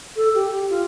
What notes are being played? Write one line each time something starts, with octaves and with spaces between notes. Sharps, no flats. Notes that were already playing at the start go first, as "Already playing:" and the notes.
A4
G4
G4
F4